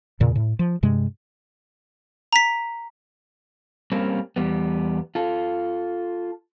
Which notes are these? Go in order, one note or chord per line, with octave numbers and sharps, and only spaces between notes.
E2 A#2 C#3
A2
F3
G2 C3 G#3
A#5 B6
G3 A#3 C4 C#4
E2 G3 B3
F4 A4